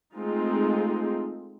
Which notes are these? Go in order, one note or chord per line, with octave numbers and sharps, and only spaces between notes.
G#3 A3 C4 D#4 F4